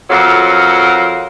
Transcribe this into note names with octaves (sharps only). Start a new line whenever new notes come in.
F2 F#3 A#4 F5 F#5